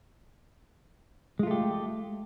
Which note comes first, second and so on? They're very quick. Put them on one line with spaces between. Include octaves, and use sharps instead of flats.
G#3 F4 A3 G4